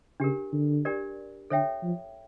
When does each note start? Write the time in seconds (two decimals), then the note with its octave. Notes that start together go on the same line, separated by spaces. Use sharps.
0.20 C#3 D4 G4 A#4
0.52 D3
0.85 D4 G4 A#4 D5
1.50 D3 A4 C#5 E5 G5
1.83 F3